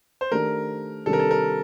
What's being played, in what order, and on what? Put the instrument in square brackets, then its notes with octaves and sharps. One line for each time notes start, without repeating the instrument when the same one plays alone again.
[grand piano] C5
[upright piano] D#3 A3 D4 G4 [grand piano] A#4
[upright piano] C3 D#3 G3 D4 G4 [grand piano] A4
[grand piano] A#4
A4
A#4